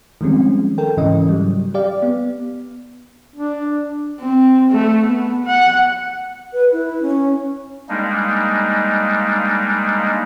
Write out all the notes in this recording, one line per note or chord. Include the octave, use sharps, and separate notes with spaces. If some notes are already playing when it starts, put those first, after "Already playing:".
D#3 F3 G3 G#3 C4 C#4
A4 A#4 G5
G#2 C#3 E3 C#4 D#5
F#3 G3
G4 D5 F5
B3
D4
C4
A3
B3
F#5
B4
E4
C#4
G3 G#3 A#3 D4 D#4